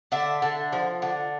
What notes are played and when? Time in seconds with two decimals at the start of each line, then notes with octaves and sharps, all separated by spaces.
0.12 D3 E5
0.42 D3
0.73 F3
1.02 D3